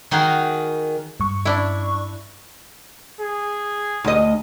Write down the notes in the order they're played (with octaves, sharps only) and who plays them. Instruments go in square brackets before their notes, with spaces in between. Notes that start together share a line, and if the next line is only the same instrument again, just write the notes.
[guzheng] D#3 D#4 F#4 G#4 A#4
[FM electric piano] G2 C#6
[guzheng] D4 E4
[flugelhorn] G#4
[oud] D2 D#5